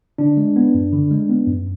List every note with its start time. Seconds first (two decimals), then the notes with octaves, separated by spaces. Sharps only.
0.18 D3 D4
0.37 G#3
0.56 B3
0.74 F#2
0.93 D3
1.11 G#3
1.29 B3
1.47 F#2